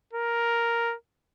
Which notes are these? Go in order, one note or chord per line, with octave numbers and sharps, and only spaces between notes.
A#4